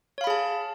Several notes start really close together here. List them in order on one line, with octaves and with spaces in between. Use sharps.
C#5 F5 B5 G#4 A5